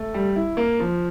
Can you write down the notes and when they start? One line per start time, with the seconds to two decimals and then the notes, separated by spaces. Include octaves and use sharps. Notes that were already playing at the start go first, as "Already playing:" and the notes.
Already playing: A3
0.14 G3
0.36 E4
0.57 A#3
0.80 F3